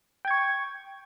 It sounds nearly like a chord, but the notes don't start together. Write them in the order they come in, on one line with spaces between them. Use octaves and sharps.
G5 G#6 C#6